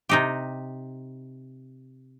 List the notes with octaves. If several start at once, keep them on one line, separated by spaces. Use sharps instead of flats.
C3 D#4 G4